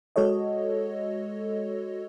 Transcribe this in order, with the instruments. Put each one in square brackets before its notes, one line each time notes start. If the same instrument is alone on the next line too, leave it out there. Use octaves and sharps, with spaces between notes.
[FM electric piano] G#3 F#4 A4 C#5 D#5